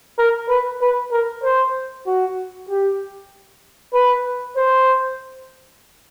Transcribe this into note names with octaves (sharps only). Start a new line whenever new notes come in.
A#4
B4
B4
A#4
C5
F#4
G4
B4
C5